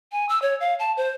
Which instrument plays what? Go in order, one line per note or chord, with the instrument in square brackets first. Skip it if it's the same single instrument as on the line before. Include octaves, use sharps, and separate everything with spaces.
[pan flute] G#5
E6
C#5
F5
A5
C5